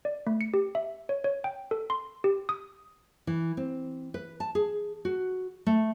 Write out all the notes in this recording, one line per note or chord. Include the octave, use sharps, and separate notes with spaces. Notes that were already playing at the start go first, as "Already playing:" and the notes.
D5
A3
C#7
G4
E5
C#5
C#5
G5
A4
C6
G4
D#6
E3
C4
B4
A5
G#4
F#4
A3